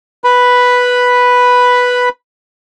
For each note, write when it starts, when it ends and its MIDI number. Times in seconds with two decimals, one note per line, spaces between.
0.24 2.09 71
0.24 2.09 83